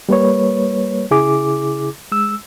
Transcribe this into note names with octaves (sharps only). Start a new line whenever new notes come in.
G3 A#3 B4 C#5
C#3 E4 G#4 D6
G#3 E6